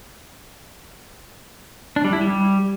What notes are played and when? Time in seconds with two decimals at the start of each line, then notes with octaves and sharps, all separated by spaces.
1.96 D4
2.05 G3
2.13 E4
2.21 G3